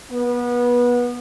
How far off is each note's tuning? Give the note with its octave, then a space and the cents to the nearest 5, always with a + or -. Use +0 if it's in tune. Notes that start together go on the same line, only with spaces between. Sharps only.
B3 -25